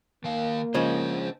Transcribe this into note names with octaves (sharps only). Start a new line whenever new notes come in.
D#3 A#3 F5
C#3 F3 G#3 D4 C5